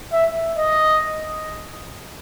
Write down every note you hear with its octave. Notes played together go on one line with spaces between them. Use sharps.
E5
D#5